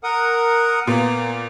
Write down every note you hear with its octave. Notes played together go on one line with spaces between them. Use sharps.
A#4 F#5 D#6
A#2 A#3 B3